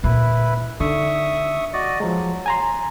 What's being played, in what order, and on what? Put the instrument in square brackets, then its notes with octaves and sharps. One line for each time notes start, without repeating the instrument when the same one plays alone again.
[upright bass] D2 A#2 [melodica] E4 B4
[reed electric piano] D3 [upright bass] D#4 [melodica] E5 C#6 D#6
[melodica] F#4 D5 D#5
[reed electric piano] F3 G#3 [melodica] F#3
[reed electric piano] G#5 A#5 C6